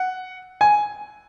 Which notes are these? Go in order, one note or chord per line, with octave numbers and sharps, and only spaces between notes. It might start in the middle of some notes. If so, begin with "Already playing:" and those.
Already playing: F#5
G#5